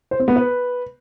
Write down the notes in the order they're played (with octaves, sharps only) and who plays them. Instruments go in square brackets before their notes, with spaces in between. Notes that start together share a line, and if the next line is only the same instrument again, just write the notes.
[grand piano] C5
C4
B3
B4